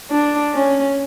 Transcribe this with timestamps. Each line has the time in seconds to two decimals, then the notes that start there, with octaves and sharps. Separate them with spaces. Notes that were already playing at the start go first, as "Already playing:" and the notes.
0.11 D4
0.54 C#4